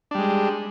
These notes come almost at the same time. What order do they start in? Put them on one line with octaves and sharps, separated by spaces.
D4 G3 G#3